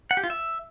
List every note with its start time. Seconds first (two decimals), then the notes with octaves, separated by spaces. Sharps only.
0.11 F#5
0.17 G4
0.24 F4
0.30 E5